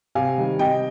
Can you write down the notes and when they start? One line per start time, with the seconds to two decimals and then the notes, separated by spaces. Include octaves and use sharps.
0.15 C3 F5 G#5
0.38 D#3 G3
0.59 C3 D#5 G5